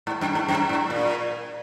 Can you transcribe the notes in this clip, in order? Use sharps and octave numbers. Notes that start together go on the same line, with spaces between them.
G#2
F#2
G#2
F#2
G#2
A#2